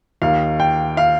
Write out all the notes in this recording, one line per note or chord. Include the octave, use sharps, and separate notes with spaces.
D#2 D#3 F5
G5
F5